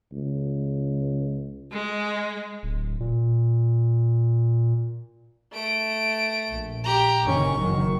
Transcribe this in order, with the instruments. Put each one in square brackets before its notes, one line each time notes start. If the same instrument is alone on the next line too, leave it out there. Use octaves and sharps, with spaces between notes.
[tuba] C#2
[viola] G#3
[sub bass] D1
A#2
[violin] A3 D7
[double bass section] A#1
[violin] G4 A#5
[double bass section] F#1 D#3 C#4 [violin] C#6
[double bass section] F#1 D#3 F#3